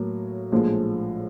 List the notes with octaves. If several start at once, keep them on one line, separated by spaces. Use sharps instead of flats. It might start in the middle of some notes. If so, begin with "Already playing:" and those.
Already playing: A2 F#3 A#3
A#1 A2 F3 G#3